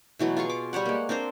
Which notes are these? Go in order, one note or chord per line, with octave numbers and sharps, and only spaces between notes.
B2 E3 F#3 A3
F4 G#4 F5 C#6
D6
G3 G4 C#5 F#5
G#3 A#3
C4 D4 A#4 C5